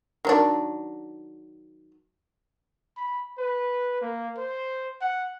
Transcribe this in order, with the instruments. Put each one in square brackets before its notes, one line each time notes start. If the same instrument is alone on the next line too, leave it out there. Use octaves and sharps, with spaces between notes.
[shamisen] D#3 F#3 D4
[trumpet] B5
B4
A#3
C5
F#5